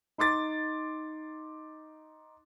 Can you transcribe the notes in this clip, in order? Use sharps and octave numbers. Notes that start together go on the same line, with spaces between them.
D#4 C6 D6 A6